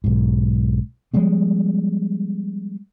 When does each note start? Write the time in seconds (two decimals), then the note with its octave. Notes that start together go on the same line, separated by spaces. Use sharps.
0.04 B1 G#2
1.14 F3 G3 G#3 B3